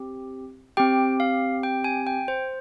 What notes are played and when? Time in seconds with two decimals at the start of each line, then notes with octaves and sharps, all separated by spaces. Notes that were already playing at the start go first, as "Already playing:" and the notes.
Already playing: C4 G4
0.77 C4 G4 G5
1.20 F5
1.63 G5
1.84 G#5
2.07 G5
2.28 C5